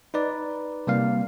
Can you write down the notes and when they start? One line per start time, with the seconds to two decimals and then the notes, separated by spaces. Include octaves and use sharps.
0.14 D#4 B4 D5
0.87 C3 G3 A#3 F5